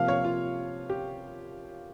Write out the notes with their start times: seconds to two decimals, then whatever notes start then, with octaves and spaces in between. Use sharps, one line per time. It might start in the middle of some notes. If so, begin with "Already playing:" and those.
Already playing: C3 F3 A#3 F5
0.08 C#5
0.25 F4
0.90 G4